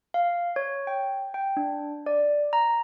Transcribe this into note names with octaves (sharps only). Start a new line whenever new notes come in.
F5
C#5
G5
G5
D4
D5
A#5